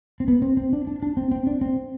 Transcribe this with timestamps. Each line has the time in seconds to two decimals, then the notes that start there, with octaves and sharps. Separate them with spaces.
0.20 C4
0.28 B3
0.42 C4
0.57 C4
0.73 D4
0.87 D4
1.02 D4
1.17 C4
1.31 C4
1.47 D4
1.61 C4